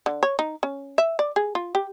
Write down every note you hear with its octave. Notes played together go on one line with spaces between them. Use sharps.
D3
C#5
D#4
C#4
E5
D5
G#4
F4
G4